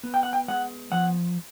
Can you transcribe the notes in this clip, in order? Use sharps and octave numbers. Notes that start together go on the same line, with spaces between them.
B3
G5
F#5
G5
G#3 F#5
F3 F#5